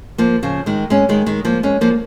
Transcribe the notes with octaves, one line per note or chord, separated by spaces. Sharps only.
F3 A#3
C#3 F3
D#3 G#3
G#3 C#4
D#3 G#3
D#3 G#3
F3 A#3
G#3 C#4
F3 A#3